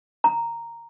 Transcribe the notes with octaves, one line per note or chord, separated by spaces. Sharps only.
A#5